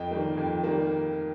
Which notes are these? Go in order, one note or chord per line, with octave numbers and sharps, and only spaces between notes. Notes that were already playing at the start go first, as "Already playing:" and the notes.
Already playing: F2 D#5 G5
D#3 G3 A#3
F2
D#3 G3 A#3